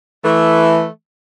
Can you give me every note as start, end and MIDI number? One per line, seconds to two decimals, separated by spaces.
0.25 0.87 52
0.25 0.87 57